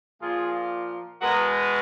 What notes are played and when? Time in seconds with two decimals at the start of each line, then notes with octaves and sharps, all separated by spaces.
0.21 A#2 F3 A#3 F4 G#4
1.22 B2 G#3 B3 F#4 A#4